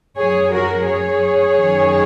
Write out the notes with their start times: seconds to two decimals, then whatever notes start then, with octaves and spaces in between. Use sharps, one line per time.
0.17 F#2 F#3 G#4 C#5
0.51 F#4 A#4
0.87 G#4 C#5
1.57 F#2 D#3 F#3